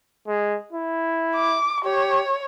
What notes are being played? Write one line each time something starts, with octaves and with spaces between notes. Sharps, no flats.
G#3
E4
D6
G4 C#5